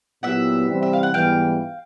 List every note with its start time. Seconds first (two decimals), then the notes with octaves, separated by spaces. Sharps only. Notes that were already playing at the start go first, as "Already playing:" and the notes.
0.23 A#2 F#3 B3 E4 G4 E5 F#5
0.70 C3 E3 G3 C4
0.83 E5
0.93 F5
1.03 F#5
1.14 G#2 E3 G3 B3 F5 G5